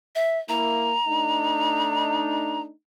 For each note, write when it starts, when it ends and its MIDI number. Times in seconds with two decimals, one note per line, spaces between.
0.15 0.38 76
0.49 0.93 58
0.49 0.93 64
0.49 2.60 82
1.07 2.70 57
1.07 2.70 62
1.07 2.70 63